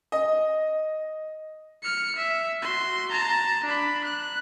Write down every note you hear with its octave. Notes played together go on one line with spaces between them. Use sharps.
D#5
F6 C#7
E5
F#4 C6
A5 A#5
D4 B5
F#6